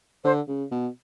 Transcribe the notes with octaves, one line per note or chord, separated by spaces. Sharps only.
D3 C5
C#3
B2